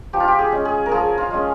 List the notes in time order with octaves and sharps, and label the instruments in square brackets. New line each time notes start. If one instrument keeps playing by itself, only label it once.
[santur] F3 G4
F4
G4
G#4
G#3 C#4
G#4
A#4
F3 G#4
F4
G#3 C#4